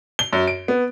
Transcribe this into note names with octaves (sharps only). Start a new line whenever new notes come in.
G7
F#2
D7
B3